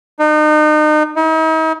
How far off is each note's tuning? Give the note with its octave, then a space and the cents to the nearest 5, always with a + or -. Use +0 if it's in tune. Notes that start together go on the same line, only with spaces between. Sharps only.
D#4 -35
D#4 +45